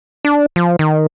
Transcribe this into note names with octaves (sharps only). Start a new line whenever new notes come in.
D4
F3
D#3